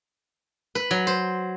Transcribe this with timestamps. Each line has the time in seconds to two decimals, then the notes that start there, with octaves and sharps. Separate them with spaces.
0.75 B4
0.91 F#3
1.07 C5